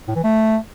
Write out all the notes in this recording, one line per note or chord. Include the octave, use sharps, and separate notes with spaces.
A2
E3
A3